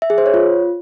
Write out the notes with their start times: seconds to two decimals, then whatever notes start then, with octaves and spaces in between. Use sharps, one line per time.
0.02 E5
0.10 G#4
0.18 C5
0.26 C#5
0.34 F4